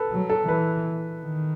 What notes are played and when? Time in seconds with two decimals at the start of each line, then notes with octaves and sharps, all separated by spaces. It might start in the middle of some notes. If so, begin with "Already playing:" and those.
Already playing: A4 B4
0.12 F#3
0.30 A4
0.48 E3 B4
1.22 D#3